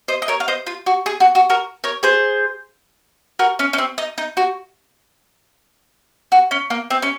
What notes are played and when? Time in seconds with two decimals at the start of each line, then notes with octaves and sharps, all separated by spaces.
0.08 C5 D#5
0.22 D#5
0.28 A#4 C#5
0.40 F5
0.48 C5 D#5
0.67 F4
0.86 F#4
1.06 G#4
1.20 F#4
1.35 F#4
1.50 F#4 A#4
1.84 A#4 C#5
2.03 G#4 C5
3.39 F#4 A#4
3.59 C#4
3.73 C#4
3.78 C4
3.98 D#4
4.18 D#4
4.37 F#4
6.32 F#4
6.51 C#4
6.70 A#3
6.90 C4
7.02 C#4